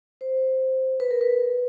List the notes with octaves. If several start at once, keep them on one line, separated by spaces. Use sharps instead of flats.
C5
B4
A#4
B4